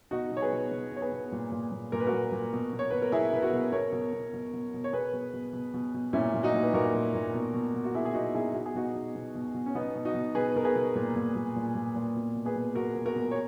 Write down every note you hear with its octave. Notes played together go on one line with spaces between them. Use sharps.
B2 D#4 F#4
B2
C#5
G#4 B4
B2
B2
B2 C#5
G#4 B4
B2
A#2
A#2
A#2
A#2 A#4
B4
F#4 A#4
A#2
A#2
B2
B2
C#5
B2 B4
A#4
B2 E4 G#4
B2 B4
F#4 A#4
B2
B2 A#4 C#5
B2
B2
B2
B2
B2
C#5
B2 G#4 B4
B2
B2
B2
B2
B2
A#2 C#4 E4
A#2
D#4 F#4
A#2
B4
A#2 F#4 A#4
A#2
A#2
B2
B2
B2
F#4
B2 E4 G#4
G#4
B2 D#4 F#4
B2 E4 G#4
B2 F#4
G#4
B2 D#4 F#4
B2
B2
B2
B2
C#4
B2 B3 D#4
B2
D#4 F#4
B2
B2 G#4 B4
B2 A#4
G#4 B4
B2
A#2
A#2
A#2
A#2
A#2
A#2
B2
B2
G#4 B4
B2
B2 F#4 A#4
B2
F#4 A#4
B2
C#5